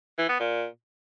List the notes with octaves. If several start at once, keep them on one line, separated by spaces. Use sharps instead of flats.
E3
B3
A#2